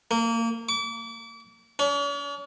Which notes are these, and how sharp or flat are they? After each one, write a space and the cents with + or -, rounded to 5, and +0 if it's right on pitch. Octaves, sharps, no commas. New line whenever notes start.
A#3 -25
D6 -35
C#4 +45